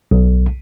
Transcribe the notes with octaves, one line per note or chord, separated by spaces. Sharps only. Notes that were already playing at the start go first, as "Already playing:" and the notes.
B1